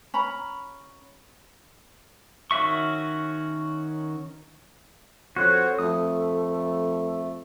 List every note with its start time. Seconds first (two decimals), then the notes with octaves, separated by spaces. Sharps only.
0.14 C#4 A#5 B5
2.51 D#3 C#4 F#4 E5 C#6
5.36 F2 F#4 A4 C5 C#5 F#6
5.79 F2 A3 D#6